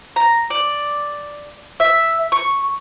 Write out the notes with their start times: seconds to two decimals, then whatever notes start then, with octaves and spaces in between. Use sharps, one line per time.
0.16 A#5
0.50 D5
1.80 E5
2.32 C#6